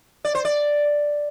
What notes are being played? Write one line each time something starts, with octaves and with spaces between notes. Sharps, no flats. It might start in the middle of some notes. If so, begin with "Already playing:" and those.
D5
C5
D5